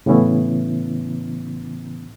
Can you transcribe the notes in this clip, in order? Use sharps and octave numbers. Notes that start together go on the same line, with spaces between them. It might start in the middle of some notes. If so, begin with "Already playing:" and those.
A2 C#3 E3 B3 C#4 E4